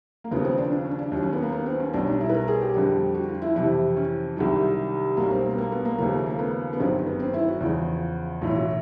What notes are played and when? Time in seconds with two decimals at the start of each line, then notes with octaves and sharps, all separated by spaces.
0.24 A#3
0.31 D#2 C#3 F3 B3
0.45 C4
0.58 D4
0.72 D4
0.85 C#4
0.99 D4
1.12 D#2 D#3 F#3
1.23 C#4
1.33 B3
1.42 A#3
1.52 B3
1.66 C4
1.80 C#4
1.93 B1 B2 G3 D4
2.07 D#4
2.21 E4
2.29 B4
2.34 A#4
2.48 G#4
2.61 G4
2.74 F2 D3 G3
3.14 F#4
3.29 F4
3.42 E4
3.56 F2 C3 E3 E4
3.96 C#4
4.36 C2 C3 D#3 F#3
5.17 B1 B2 G3 A#3
5.30 C4
5.45 A#3
5.52 B3
5.58 A#3
5.72 B3
5.85 A#3
5.98 D#2 C#3 F3 A#3
6.13 A3
6.26 A#3
6.39 B3
6.73 B3
6.80 G1 F#2 D#3 F#3 C4
7.07 B3
7.20 C4
7.34 E4
7.48 F#4
7.60 E2 C#3 F3
8.42 B1 A2 E3 F4
8.55 F#4